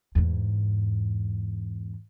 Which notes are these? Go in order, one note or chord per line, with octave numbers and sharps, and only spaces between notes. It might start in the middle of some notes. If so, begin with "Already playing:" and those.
E2 G#2